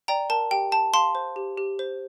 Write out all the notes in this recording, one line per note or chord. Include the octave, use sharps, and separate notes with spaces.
D5 G5 A#5
A#4 A5
G4 G5
G5 A5
F5 A5 C6
C5
G4
G4
C5